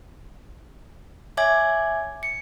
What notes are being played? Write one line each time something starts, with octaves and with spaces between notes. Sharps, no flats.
C#5 E5 G#5 D6 G#6
C#7